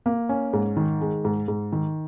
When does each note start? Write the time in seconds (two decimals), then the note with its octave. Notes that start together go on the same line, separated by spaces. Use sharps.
0.06 A#3
0.29 C#4
0.53 G#2
0.77 D#3
1.01 G#3
1.25 G#2
1.48 G#2
1.72 D#3